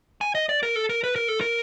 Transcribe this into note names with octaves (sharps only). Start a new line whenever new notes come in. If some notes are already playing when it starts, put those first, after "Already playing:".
G#5
D#5
D5
A#4
A4
A#4
B4
A#4
A4
A#4